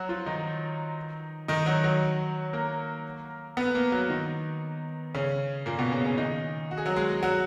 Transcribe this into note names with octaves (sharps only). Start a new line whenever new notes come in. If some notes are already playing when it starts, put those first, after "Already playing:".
Already playing: F#3 F#4
F3 F4
D#3 D#4
D#3 D#4
F#3 F#4
F#3 F#4
A#3 A#4
B3 B4
A#3 A#4
F#3 F#4
D#3 D#4
C#3 C#4
A#2 A#3
B2 B3
C#3 C#4
C#3 C#4
D#3 D#4
F#4
G#4
F#3 F#4
G#3 G#4
F#3 F#4